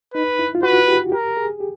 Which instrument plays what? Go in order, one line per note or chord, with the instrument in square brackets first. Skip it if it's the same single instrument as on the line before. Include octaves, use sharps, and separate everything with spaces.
[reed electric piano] D#4 [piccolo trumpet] B4
[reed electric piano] E4
F4
[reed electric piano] F#4 [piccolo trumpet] B4
[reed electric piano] G4
[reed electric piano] G4 [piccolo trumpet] A#4
[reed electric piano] G#4
G4